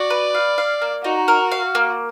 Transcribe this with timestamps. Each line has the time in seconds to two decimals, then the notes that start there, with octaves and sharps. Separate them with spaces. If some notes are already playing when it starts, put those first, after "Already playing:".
Already playing: F#4 D5
0.10 B4
0.35 F5
0.58 F5
0.82 A#3
1.04 D#4 F#4
1.28 A#4
1.52 F5
1.75 A#3